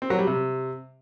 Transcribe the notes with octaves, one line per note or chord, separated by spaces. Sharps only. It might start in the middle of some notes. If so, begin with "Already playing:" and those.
C4
F#3
G3
C3